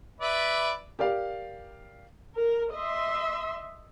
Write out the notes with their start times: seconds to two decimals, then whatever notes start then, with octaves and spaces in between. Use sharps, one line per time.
0.21 B4 D5 E5
0.99 G4 A#4 D5 F5
2.36 A#4
2.74 D#5 E5 C6